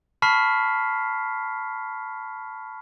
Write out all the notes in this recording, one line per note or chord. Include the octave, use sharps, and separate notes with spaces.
A5 B5 C#6 F6 B6 C7